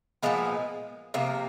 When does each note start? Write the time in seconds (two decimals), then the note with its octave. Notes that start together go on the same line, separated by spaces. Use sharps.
0.23 A#2 F3 G#3 B3
1.14 C3 F3 A#3